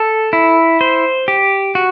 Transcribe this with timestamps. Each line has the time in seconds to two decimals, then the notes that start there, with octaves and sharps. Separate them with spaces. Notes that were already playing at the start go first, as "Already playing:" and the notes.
Already playing: A4
0.33 E4
0.81 C5
1.28 G4
1.75 F#4